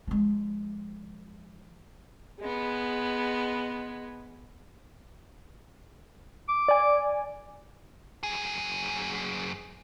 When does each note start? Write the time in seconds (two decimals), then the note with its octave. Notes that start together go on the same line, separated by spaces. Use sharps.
0.08 F3 G#3
2.40 G#3 B3
6.49 D6
6.68 D5 G#5
8.23 F#2 G#4